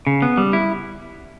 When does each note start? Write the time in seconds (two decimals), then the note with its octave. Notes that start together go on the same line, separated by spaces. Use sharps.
0.07 C#3
0.22 B3
0.37 G3
0.53 E4